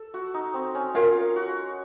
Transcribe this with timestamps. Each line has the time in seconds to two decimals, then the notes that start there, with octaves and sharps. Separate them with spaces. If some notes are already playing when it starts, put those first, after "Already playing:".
Already playing: A4
0.14 F#4
0.34 D#4
0.54 C4
0.75 C#4
0.94 F4 A#4 C#5 F5
1.36 F#4